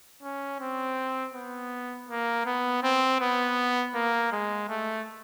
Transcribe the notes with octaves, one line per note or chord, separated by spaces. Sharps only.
C#4
C4
B3
A#3
B3
C4
B3
A#3
G#3
A3